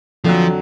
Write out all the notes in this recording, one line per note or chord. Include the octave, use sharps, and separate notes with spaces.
F2 D3 F3 F#3